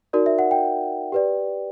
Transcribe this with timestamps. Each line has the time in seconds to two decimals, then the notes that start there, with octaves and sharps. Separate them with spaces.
0.13 D#4 F#4 A#4 D5
0.26 E5
0.39 F#5
0.51 G5
1.12 G4 B4 D5